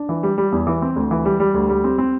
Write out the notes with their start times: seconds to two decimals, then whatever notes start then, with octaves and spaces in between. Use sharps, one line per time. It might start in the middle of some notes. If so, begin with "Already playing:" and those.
Already playing: D4
0.09 E3
0.23 G3
0.38 G3
0.52 E2
0.67 E3
0.82 C4
0.96 D2
1.11 E3
1.25 G3
1.40 G3
1.54 D2
1.69 G3
1.84 C4
1.98 C4